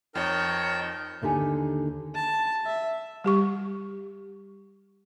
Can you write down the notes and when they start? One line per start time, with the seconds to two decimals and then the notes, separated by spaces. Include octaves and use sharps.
0.15 F2 D#4 A#4 C#5 G5 A5
1.22 D#2 D3 D#4 G4 G#5
2.15 A5
2.66 E5
3.24 G3 G4 C#6